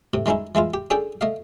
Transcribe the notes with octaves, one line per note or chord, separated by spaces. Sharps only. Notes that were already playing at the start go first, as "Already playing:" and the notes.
A2 C3
D#3 G#3 C#4 D#4 E4
E3 G#3 E4 F4
G4
C#4 D4 G#4 A4 G5
A3 D#5 F5